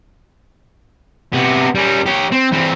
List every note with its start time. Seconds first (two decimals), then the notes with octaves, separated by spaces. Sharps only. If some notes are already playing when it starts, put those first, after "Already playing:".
1.33 C3 B3
1.75 G3 C#4
2.06 G4 C#5
2.32 C4
2.52 E3 C4